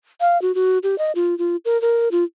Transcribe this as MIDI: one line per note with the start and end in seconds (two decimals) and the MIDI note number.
0.21 0.40 77
0.42 0.55 66
0.55 0.78 66
0.83 0.98 67
0.98 1.12 75
1.15 1.37 65
1.38 1.56 65
1.65 1.80 70
1.82 2.09 70
2.12 2.24 65